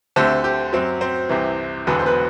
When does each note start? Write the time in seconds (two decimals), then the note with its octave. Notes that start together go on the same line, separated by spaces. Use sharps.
0.16 D2 D3 A3 C4 G4
0.44 G4
0.73 F#2 F#3 C4
1.01 C4 C5
1.29 C2 C3 E3
1.87 E1 E2 D3 F#3 B3 B4
1.99 C5
2.05 B3 B4